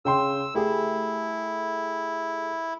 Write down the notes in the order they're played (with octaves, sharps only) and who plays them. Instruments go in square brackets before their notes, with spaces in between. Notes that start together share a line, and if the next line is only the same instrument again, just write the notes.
[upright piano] C#3 G5 C6 [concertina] E6
[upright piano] A3 G4 G#4 [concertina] E4